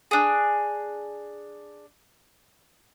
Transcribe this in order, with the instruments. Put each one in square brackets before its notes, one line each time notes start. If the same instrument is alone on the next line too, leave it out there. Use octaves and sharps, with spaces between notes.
[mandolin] D4 G#4